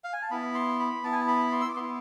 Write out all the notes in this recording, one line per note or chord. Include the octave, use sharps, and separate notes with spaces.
F5
G#5
A5
B3 E4 B5
C6
B5
B3 E4 A5
G#5
A5
B5
C6
E6
D6
B3 E4 C6